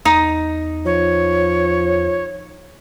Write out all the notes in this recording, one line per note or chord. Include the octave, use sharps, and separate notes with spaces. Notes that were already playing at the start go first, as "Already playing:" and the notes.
E2 D#4 D#6
F3 C#5